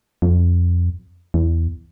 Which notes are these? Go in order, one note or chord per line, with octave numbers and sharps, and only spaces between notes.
F2
E2